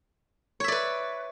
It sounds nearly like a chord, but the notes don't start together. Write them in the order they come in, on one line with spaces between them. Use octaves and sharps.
C#5 E5 D5 B4